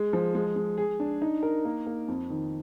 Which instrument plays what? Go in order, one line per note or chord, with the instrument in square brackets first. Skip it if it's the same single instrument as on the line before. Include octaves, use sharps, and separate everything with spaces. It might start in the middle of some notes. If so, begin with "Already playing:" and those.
Already playing: [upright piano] G#3
F3
G#3
G#3
G#4
D4
D#4
A#4
A#3
A#3
F2
D#3